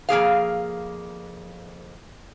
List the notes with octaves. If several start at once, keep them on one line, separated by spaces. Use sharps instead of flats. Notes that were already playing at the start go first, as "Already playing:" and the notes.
F2 A#3 G#4 F5